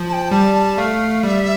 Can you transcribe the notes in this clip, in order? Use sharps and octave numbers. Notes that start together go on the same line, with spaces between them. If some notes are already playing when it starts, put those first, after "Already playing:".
Already playing: F3
A5
G5
G3 A5
A5
A3 F5
G3 E5